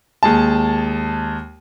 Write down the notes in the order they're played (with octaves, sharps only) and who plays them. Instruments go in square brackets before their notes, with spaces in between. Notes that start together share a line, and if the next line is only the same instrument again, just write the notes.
[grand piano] D#2 G#3 A5